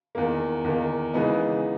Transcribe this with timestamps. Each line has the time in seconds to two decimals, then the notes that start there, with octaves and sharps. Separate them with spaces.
0.15 E2 D#3 A#3
0.64 E2 D#3 A#3
1.14 C#3 E3 G#3 B3 D#4